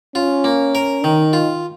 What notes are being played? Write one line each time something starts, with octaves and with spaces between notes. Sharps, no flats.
C#4 F4
A#3
A#4
D#3 D#4
F4